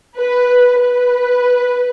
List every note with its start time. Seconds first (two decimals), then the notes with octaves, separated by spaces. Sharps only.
0.18 B4
0.81 B4